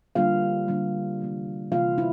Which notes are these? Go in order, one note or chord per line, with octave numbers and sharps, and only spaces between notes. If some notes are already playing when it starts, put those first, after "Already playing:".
D3 G3 A#3 F4 F5
D3 G3 A#3
C3 E3 A#3
C3 E3 A#3 F4 F5
E4